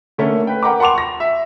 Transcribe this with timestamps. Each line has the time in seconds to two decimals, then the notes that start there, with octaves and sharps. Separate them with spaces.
0.18 D3 A3 A#3 C#4
0.47 B4 G5
0.63 A#4 F#5 G5 A#5 B5 D6
0.80 F#5 A5 C6 D6 F7
0.95 C#6 A#6
1.20 E5